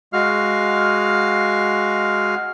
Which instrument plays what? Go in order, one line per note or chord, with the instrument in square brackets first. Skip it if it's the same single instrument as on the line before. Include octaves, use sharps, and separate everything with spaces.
[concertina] G#3 F#4 F5 F6